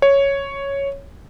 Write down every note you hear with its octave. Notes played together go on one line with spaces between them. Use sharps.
C#5